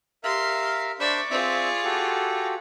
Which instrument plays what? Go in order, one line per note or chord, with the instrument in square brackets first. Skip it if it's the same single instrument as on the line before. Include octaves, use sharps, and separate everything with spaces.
[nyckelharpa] G4 [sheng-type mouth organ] A#4 E5 F5 [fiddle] C6
[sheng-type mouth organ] D4 C5 B5 [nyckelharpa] D5 C#6 [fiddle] E5
[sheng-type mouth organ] C4 E5 [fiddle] F4 G#4
[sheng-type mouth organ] F#4 G4 A4